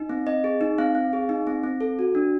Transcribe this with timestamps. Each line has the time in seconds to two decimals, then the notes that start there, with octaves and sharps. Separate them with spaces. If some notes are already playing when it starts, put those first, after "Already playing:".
Already playing: D#4
0.09 C4
0.26 C4 D#5
0.44 G#4
0.61 D#4
0.78 C4 F5
0.95 C4
1.13 G#4
1.29 D#4
1.47 C4
1.63 C4
1.81 A4
1.99 F#4
2.15 D4